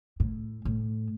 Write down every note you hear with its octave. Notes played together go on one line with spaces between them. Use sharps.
A2
A2